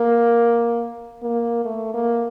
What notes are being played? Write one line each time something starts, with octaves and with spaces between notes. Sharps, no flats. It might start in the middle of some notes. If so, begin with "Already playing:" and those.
Already playing: A#3
A#3
A3
A#3